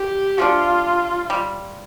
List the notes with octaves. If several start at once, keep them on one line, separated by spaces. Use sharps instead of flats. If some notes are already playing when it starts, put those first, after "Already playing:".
Already playing: G4
F3 A3 D4 F4
G3